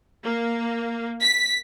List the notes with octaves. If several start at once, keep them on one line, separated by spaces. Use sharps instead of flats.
A#3
B6